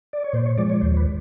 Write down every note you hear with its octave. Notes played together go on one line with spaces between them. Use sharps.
D5
C#5
A#2 C5
C#5
F3 G#3 D5
C#5
D#2 C5
B4